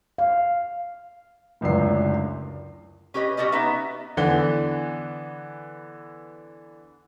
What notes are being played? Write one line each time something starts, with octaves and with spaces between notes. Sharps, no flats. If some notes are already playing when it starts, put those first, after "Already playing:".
F5
D1 C#2 F#2 D4 C7
C#4 G4 B4 D#5
G3 C#4 F#4 G4 D5 D#5
B3 D#4 B4 E5
D3 E3 B3 F#5 G7